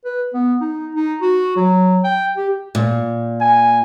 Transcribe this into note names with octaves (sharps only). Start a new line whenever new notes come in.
B4
B3
D#4
D#4
F#4
F#3
G5
G4
A#2
G#5